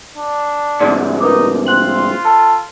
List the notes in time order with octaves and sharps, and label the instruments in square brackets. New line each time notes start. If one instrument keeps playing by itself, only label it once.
[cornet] D4
[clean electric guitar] C2 G#2 [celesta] D5
[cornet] D#4 [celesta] A#4 B4 D6
[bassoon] C4 [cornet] F4 [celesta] F#6 F#7
[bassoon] A4